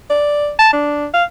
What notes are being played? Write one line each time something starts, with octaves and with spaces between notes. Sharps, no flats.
D5
A5
D4
F5